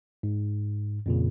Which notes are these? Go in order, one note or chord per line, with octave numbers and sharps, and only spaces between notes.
G#2
F2 A#2 C#3